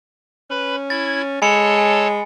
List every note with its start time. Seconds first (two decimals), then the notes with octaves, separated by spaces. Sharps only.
0.50 C#4 B4 B5
0.90 E4 G#6 A6
1.42 G#3 A4 C#5 G#5 A5 B5 C#7
1.78 G#5